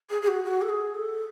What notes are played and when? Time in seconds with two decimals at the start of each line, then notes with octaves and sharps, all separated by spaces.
0.10 G#4
0.22 G#4
0.28 F#4
0.44 F#4
0.62 A4
0.69 G#4
0.94 A4